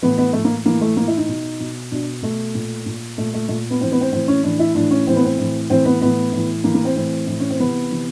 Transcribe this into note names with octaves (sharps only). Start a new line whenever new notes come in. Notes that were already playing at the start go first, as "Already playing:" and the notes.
A2 E3 B3
B3
A2 E3 A3
A#3
A2 E3 A#3
A3
A2 E3 A#3
E4
D#4
B2
B2
B2 D4
B2 A3
A#2
A#2
A#2 A3
A3
A#2 A3
B3
A2 E3 C4
B3
C4
A2 E3 C4
C#4
A2 E3 D4
E4
A2 E3 D4
C#4
A2 E3 C4
B3
C4
A2 E3
A2 E3 C4
B3
A2 E3 B3
A2 E3
A2 E3 A#3
A#3
C4
A2 E3 C4
A2 E3
C#4
C4
C3 E3 B3
C3 E3